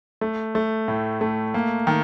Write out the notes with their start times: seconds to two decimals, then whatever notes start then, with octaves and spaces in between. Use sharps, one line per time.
0.21 A3
0.55 A3
0.88 A2
1.21 A3
1.54 A#3
1.87 D#3